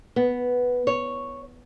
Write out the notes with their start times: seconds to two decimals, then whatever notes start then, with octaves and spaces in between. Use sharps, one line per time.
0.16 B3
0.87 C#5